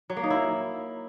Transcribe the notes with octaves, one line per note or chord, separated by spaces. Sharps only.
F#3
A#3
D#4
E4